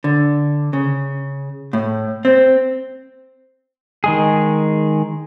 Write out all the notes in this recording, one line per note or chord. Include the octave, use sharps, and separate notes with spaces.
D3
C#3
A2
C4
D#3 G#3 G#4